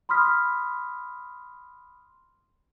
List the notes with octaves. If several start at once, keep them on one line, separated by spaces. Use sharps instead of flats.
B5 C6 D#6 F6 B6